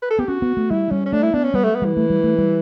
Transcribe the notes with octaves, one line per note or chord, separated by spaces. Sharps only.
B4
A4
B3 G4
C#4 F#4
B3
A3
G3 E4
G3 C#4
C#4
A3 D4
E4
B3 D4
C#4
G3 B3
A3
B3
E3 G3
A3
G3
A3
G3